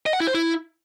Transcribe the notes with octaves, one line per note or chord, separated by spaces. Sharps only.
D#5
F#5
E4
C5
E4